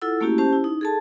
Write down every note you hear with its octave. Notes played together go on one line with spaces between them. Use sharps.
E4 F4 A4 F#5 E6
A3 A#3 C#4 E4 F#4 G4
C#4 G4 C5 A5
E4
D#4
G#4 A4 A5